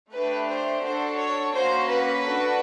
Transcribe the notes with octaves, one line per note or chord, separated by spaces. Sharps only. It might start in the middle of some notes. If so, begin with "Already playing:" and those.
A3 D4 G4 B4
C5
D4 F#4 A4 C5
C#5
A#3 C#4 F#4 C5
B4
D4 F#4 A4